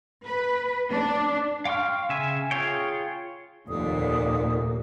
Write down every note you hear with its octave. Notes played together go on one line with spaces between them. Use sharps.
B4
D4
F5 G5 C6 C#6 F6
C#3 E5 G#5
F4 G#4 C#5 G5
F1 D#2 A#2 D3 D#6